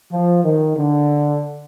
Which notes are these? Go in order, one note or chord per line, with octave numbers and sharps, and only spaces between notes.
F3
D#3
D3